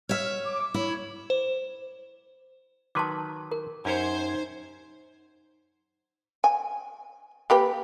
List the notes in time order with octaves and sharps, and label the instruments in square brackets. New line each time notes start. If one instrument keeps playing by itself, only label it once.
[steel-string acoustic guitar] C#5 E5 [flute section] F6
[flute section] D6
[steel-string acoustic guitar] E4 [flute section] C#5
[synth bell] C5
[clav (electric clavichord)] D#3 F#3 B4 [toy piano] A5 C6 D6
[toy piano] A#4
[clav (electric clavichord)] F#2 G4 C#5 [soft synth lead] D#4 [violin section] C5 G#6
[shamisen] G#5
A#3 G4 B4